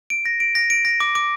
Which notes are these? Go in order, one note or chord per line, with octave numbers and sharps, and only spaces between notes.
D7
A#6
D7
A#6
D7
A#6
D6
D6